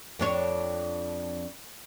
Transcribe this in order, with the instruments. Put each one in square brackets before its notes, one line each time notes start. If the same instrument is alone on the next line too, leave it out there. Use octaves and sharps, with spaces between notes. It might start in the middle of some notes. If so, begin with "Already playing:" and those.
[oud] F2 D4 C#5